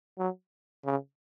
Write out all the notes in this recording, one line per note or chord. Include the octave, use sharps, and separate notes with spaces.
F#3
C#3